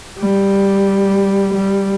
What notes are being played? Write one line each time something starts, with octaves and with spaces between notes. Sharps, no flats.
G3
G3